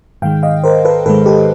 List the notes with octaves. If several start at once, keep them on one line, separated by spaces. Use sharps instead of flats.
G#2 D#3 G#3 F5 G5
D#5 F5
A#4 C5
A4 B4
G#2 D#3 G#3 A4 B4
G4 A4